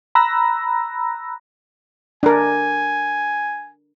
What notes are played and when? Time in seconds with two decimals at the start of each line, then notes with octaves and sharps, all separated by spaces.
0.15 A#5 B5 E6 F#6 A#6
2.23 D4 A#4 G#5